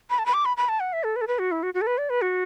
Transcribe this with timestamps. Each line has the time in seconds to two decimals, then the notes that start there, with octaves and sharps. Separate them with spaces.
0.10 B5
0.19 A5
0.26 B5
0.34 D6
0.45 B5
0.57 B5
0.69 A5
0.80 F#5
0.93 E5
1.04 A4
1.16 B4
1.21 A4
1.28 B4
1.39 F#4
1.52 E4
1.63 F#4
1.74 F#4
1.81 A4
1.87 B4
1.98 D5
2.10 B4
2.22 F#4